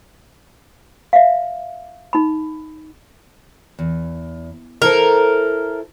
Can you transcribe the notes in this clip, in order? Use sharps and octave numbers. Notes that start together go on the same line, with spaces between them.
E5 F5
D#4 B5
E2
E4 A4 A#4 C5